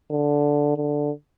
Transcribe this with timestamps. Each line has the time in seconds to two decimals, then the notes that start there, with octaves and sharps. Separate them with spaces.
0.11 D3
0.76 D3